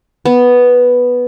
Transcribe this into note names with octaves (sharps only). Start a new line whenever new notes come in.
B3